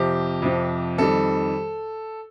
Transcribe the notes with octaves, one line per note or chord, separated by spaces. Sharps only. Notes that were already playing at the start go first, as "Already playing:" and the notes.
Already playing: F2 C3 F3 G4
F2 C3 F3
F2 D#3 G3 A4